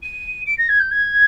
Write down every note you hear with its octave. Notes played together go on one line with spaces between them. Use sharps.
D#7
D7
A#6
G#6
G6
G#6